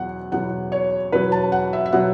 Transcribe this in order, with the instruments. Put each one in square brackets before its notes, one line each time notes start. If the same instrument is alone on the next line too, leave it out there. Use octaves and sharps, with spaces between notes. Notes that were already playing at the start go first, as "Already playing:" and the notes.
Already playing: [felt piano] E2 B2 F#3 F#5
E2 B2 F#3 F#5
C#5
E2 B2 F#3 B4
A5
F#5
E5
E5
B2 F#3 F#5